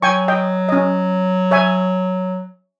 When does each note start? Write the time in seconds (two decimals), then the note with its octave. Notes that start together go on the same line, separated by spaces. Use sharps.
0.02 F#3 G5 G#5 C#6
0.28 D#5 G5
0.69 C#4 D#5
1.51 C#5 E5 G#5